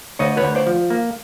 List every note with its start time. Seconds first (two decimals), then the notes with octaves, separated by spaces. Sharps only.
0.19 D2 C#5 D#5
0.37 B4 C#5
0.43 D2
0.55 C5 D5
0.67 F3
0.90 A#3